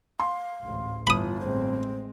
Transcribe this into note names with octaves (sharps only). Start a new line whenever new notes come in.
F5 C6
A1 D2 G#2
G1 E3 F4 B5 D#6
A1 G#3 C4 C5